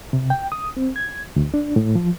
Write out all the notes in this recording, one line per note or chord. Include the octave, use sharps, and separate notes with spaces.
C3
G5
D#6
C4
G#6
D2
D4
A2
F3